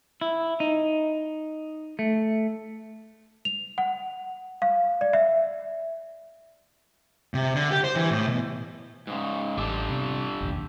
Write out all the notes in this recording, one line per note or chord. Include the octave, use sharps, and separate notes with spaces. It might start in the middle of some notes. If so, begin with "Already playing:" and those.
E4
D#4
A3
F7
F#5
F5
D5
E5
C3
D3
G4
C5
E3
A2
B2
G#2 C#3
A1 D4 G4 A4
C3
F1 A#1 D#2